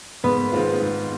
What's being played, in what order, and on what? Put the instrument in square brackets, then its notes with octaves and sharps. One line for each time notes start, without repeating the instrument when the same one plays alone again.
[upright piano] G#2 [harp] B3
[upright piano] D#3 G#3 C4 F4
G#2